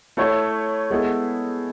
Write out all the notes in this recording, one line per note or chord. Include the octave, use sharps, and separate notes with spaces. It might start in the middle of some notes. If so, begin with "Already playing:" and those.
A3 E4 A4 C#5
G#3 B3 E4 A4